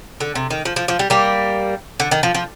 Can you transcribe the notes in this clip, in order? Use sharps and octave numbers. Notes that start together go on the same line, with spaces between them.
D3
C3
D#3
F3
F3
F3
G3
G3 A#3
D3
D#3
F3
F3